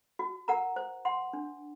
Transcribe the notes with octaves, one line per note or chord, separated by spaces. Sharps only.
F#4
A#4 F#5 A#5
C5
F#5 C6
D4